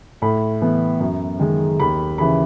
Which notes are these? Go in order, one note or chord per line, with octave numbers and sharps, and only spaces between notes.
A2 B5
E3 B3
F#2
D#3 G#3
D#2 B5
C#3 E3 B5